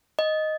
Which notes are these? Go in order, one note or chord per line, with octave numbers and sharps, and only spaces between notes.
D#5